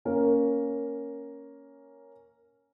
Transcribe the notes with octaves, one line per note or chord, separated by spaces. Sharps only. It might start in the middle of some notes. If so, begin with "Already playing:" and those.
A#3 C#4 A#4